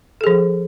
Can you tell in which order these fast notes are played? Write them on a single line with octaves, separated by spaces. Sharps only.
A4 G#4 F3